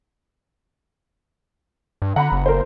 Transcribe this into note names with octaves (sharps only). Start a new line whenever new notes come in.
G2
D3 F#5 A#5 B5
F#1
A#4 C5